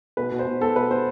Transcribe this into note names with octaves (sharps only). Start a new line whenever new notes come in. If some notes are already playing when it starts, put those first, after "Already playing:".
B2 B4
B2
C5
B2
B3 A4
B2 B4
B3 C5